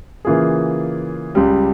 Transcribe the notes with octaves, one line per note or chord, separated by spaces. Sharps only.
C#3 E3 A#3 F4 G#4
C#2 C#3 G3